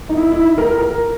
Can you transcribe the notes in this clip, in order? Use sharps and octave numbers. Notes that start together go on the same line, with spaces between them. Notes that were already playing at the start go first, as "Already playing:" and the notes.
D#4
E4
E4
A#4
A#4